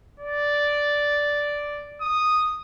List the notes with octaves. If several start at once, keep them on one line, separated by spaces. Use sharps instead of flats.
D5
D#6